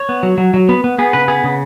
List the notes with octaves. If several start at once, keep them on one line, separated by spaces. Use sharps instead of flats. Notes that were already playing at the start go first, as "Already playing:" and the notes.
Already playing: C#5
B3
F#3
F#3
F#3
B3
B3
B3 G#4
C#3 B4
B3 G#4
C#3